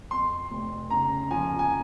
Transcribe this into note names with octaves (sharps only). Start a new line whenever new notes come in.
F2 C6
F1
C#3 A#5
F3 G#5
G#5